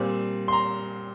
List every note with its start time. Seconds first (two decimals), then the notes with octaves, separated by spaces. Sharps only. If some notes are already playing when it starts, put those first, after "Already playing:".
Already playing: A#2 G3 C4
0.48 C6
0.53 A#5